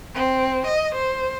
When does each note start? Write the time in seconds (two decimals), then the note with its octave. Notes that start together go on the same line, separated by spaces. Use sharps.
0.14 C4
0.66 D#5
0.94 C5